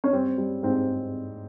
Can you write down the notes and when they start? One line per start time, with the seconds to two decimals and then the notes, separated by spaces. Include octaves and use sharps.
0.04 C#4
0.13 G3 C4
0.38 G3
0.63 G#2 C4